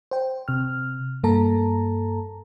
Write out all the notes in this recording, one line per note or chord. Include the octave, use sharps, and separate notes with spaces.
C5 G5
C3 F6
G2 A#3 A4 A5 A#5